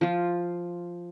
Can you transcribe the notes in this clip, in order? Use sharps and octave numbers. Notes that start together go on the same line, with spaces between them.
F3 F4